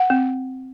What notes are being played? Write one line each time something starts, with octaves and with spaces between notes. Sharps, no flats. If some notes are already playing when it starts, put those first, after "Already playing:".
Already playing: F#5
C4